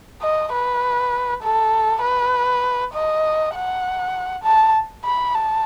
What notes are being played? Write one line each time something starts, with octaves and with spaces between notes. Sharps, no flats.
D#5
B4
A4
B4
D#5
F#5
A5
B5
A5